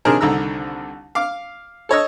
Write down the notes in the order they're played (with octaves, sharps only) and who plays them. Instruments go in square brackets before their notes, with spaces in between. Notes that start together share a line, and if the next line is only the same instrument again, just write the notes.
[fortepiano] C3 D#3 F3 D4 G#4 A#4
C2 D3 D#3 A#5 E6
F5 D6
A4 C#5 D#5 E6